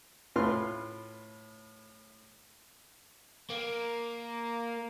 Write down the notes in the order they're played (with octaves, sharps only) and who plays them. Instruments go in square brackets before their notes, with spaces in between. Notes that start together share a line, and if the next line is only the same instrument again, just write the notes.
[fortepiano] A2 F4 B4 C6 F6
[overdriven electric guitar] A#3